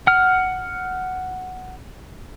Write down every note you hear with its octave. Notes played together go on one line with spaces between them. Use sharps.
F#5 F6